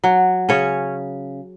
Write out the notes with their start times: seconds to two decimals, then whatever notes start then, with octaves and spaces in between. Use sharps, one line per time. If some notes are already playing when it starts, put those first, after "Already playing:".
0.04 F#3
0.49 C#3 C#4 C#5